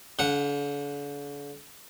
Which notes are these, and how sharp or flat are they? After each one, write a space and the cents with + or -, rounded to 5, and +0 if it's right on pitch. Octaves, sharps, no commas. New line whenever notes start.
D3 -45 F#5 +0